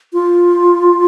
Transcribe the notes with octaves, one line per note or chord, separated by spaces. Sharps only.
F4